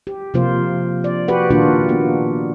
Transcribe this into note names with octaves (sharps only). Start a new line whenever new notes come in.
G4
C3 F3 A#3 F4 C5
D5
F#4 G4 B4 F#5
A#2 D#3 A#3 D4 F4 F#4
A#3 B3